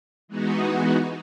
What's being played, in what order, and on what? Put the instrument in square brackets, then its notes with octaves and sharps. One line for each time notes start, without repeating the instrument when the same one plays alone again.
[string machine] E3 G#3 B3 D#4 F#4